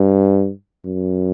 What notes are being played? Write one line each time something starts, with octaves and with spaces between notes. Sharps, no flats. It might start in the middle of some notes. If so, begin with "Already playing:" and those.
Already playing: G2
F#2